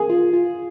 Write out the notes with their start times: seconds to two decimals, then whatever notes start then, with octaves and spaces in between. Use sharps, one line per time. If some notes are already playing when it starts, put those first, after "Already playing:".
Already playing: A#3 G#4
0.10 F4
0.33 F4